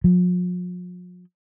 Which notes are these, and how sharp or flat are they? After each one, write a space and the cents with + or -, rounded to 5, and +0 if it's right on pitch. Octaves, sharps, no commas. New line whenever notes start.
F3 +45